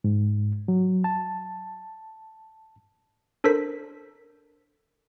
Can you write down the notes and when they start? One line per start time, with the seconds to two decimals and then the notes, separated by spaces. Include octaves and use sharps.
0.04 G#2
0.68 F#3
1.04 A5
3.44 D4 A4 A#4 C5 B6